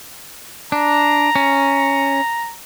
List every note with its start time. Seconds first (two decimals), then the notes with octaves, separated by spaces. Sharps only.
0.72 D4 A#5
1.36 C#4